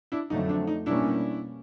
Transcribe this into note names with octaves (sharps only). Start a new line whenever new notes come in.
D4 E4
F2 D3 F#3 A3 D#4
D4
D#4
B2 G3 A#3 C#4 D4 E4